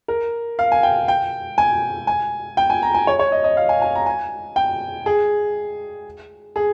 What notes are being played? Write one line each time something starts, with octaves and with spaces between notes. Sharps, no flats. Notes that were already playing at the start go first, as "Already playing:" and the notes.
A#4
F5
G#5
G5
G5
G#5
G#5
G5
G#5
A#5
G#5
C#5
C#5
D#5
D#5
F5
G#5
G#5
A#5
G#5
G5
G#4
G#4